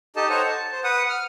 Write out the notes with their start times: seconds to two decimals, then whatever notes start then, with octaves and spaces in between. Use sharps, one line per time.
0.16 D#4 G4 A4 D#5 A5
0.30 D#4 A4 C5 C#5 F#5 A#5
0.48 A5
0.72 C5
0.84 B4 F#5 D#6
1.10 F6